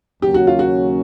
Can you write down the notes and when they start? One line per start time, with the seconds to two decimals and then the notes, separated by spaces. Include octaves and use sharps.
0.22 D#2 C#3 F#3 A#3 C#4 G4
0.34 F#4
0.47 F4
0.59 F#4